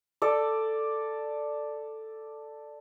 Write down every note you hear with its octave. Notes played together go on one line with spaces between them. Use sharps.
A4 D5